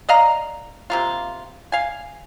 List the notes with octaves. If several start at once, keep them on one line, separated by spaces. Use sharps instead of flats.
D5 D#5 F5 A#5
C3 A#3 F4
F5 G#5